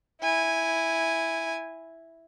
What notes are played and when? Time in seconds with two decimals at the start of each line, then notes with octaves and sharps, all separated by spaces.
0.21 E4 G#5